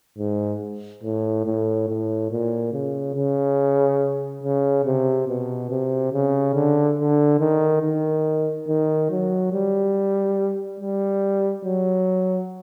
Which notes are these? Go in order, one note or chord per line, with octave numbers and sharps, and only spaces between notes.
G#2
A2
A2
A2
A#2
C#3
C#3
C#3
C3
B2
C3
C#3
D3
D3
D#3
D#3
D#3
F#3
G3
G3
F#3